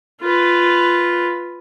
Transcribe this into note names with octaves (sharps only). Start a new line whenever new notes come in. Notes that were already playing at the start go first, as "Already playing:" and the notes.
F4 B4